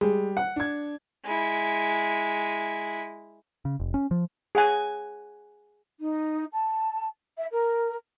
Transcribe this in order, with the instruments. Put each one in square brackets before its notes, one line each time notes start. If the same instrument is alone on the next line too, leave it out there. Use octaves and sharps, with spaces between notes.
[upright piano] G3 [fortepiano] G#3
[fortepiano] F#5
[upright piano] D4 G#6
[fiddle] G#3 E4
[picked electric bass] C#3
F1
C#4
F3
[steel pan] G#4 F#5 G#5
[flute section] D#4
A5
E5
A#4